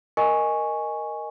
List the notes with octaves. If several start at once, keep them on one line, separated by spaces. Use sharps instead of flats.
A#4 D#5 G#5 C#6